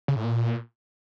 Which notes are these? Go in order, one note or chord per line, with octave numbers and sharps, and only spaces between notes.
C#3
A2
A#2